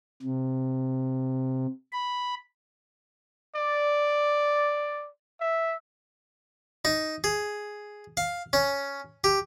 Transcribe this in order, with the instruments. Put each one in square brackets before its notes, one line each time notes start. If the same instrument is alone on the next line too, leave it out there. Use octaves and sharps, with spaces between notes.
[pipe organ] C3
B5
[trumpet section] D5
E5
[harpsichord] D#4
G#4
F5
C#4
G4